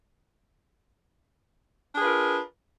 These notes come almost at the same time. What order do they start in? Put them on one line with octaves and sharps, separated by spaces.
D4 G#4 B4 F4 A#4